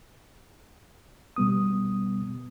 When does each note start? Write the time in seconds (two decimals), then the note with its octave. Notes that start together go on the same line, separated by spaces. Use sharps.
1.36 B2 G3 B3 D#6